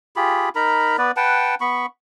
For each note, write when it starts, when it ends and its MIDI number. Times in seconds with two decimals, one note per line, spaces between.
0.16 0.49 65
0.16 0.49 67
0.16 0.49 68
0.16 0.49 83
0.55 0.97 63
0.55 0.97 70
0.55 0.97 82
0.55 0.97 83
0.98 1.11 59
0.98 1.11 71
0.98 1.11 74
1.17 1.55 71
1.17 1.55 78
1.17 1.55 79
1.17 1.55 81
1.61 1.86 59
1.61 1.86 83
1.61 1.86 85